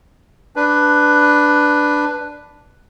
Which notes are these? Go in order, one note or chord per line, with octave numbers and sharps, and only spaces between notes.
D4 B4